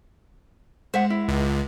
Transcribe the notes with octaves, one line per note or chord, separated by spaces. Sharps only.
G#3 C5 E5 F#5
E4
C#2